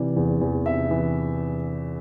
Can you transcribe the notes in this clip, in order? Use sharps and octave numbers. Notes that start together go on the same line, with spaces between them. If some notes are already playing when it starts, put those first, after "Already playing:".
Already playing: C3 E3 D5
E2
E2
C3 E5
E3